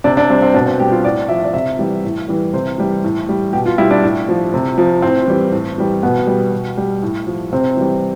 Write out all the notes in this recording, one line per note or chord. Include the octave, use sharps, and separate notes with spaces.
C3 D4
D4
G3 C4
C4
B2 D4
C4
G3 G4
F4
A2 D5
F3 E5
D5
C3 E5
E3 G3
A2
E3 G3
C3 C5
E3 G3
A2
G3
B2 G4
F4
G3 E4
D4
A2
F3
C3
F3
A2 C4
E3 G3
A2
E3 G3
B2 B3
G3
B2
G3
A2
F3
C3 C4
E3 G3